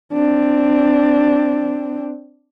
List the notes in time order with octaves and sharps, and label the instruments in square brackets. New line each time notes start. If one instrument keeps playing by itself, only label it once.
[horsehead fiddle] C4 D4